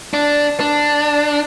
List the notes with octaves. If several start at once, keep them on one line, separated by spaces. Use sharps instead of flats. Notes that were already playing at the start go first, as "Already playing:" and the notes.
D4
D4